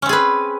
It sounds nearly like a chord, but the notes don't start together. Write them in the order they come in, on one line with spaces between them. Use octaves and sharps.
C#4 C4 G#4 B4